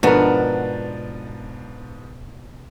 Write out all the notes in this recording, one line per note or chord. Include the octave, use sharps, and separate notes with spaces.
G#2 B2 F3 B3 D4 A#4 B4